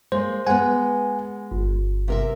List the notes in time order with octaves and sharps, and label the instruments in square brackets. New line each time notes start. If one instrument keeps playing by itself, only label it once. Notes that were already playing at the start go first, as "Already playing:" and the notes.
[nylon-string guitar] G#3 A#3 [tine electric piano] C5
[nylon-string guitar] G#3 B3 [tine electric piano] F#5 G#5
[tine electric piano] G1
[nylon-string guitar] C3 A#4 E5